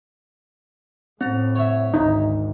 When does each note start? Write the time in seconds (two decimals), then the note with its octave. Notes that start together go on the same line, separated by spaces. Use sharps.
1.21 A2 C4 A#5
1.55 C#5 E5
1.94 G#1 D2 D#4